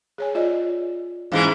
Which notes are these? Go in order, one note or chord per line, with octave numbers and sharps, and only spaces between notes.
G#4 C#5 G#5
F4 D5 D#5
G#2 E3 G#3 C#4 F5